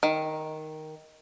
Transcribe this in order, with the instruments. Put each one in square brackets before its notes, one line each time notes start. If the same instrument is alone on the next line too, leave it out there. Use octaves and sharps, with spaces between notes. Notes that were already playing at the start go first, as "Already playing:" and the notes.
[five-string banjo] D#3